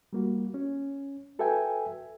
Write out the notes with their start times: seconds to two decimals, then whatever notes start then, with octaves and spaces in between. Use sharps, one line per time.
0.13 G3 A#3 F#4
0.54 C#4
1.39 F#4 A4 B4 E5 G5 G#5